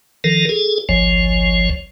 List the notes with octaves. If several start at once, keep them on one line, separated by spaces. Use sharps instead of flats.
D#3 F3 A4 A#4
G#4 A4
G#1 C#2 F3 C#5